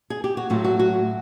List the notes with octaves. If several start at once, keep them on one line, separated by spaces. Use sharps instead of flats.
G#4
G4
F#4
A2 F#3 A3 F4
F#4
F#4